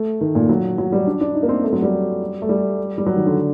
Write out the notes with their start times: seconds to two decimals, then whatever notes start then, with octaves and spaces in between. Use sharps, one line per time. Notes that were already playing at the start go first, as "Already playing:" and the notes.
Already playing: A3
0.21 D#3
0.35 A#2
0.49 F#3
0.78 F#3
0.92 G3
1.07 D4
1.21 D4
1.35 D#4
1.43 A#3
1.49 C4
1.64 A3
1.73 F#3
1.82 G3
2.42 A3
2.49 G3
2.98 G3
3.06 F#3
3.16 D#3
3.26 D3